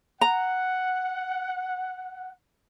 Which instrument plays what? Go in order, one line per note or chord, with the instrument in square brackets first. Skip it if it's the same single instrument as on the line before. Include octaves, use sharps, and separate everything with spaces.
[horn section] F#5 [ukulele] A#5